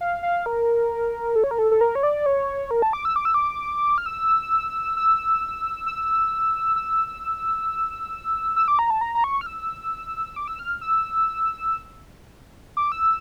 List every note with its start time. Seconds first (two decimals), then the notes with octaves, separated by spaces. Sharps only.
0.01 F5
0.23 F5
0.46 A#4
1.36 A4
1.44 C#5
1.51 A#4
1.59 A4
1.71 A4
1.81 A#4
1.95 C#5
2.03 D5
2.26 C#5
2.71 A#4
2.82 A5
2.93 D6
3.05 E6
3.16 D6
3.25 E6
3.34 D6
3.98 F6
4.06 E6
4.97 E6
5.86 E6
6.76 E6
8.56 E6
8.68 D6
8.79 A#5
8.90 A5
9.01 A#5
9.15 A#5
9.24 C#6
9.41 F6
9.46 E6
10.36 D6
10.48 E6
10.59 F6
10.81 E6
12.77 D6
12.92 E6